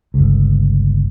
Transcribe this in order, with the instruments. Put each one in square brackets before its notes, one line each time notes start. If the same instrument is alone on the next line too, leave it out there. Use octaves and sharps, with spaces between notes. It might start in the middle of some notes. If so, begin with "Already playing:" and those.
[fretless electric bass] G1 C#2